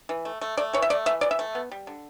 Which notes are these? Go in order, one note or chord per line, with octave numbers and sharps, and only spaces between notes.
E3
A3
A3
A3 D5
E3 C#5
E5
A3 D5
E3 E5
E3 D5
E5
A3
B3
G3
D3